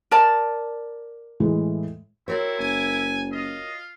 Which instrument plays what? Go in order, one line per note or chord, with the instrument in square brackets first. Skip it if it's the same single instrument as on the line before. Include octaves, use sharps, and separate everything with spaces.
[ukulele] A#4 D5 A5
[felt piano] A2 E3 G#3
[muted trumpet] C4 [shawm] E4 [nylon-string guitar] F#4 A#4 C#5
[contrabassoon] F#1 [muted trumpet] G#5
[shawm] F4 [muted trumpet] D#5